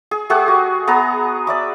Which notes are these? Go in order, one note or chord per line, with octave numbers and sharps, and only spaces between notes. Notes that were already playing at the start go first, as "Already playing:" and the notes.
G#4
A3 G4 G#4 F#5
F#4
B3 G#4 A#5 D#6
D5 E5 D6